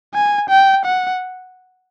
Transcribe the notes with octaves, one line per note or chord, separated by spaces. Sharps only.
G#5
G5
F#5